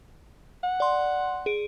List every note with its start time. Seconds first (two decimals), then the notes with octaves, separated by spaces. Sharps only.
0.64 F#5
0.80 D5 C6
1.46 G#4 D7